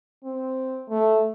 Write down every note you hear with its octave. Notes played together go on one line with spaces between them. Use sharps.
C4
A3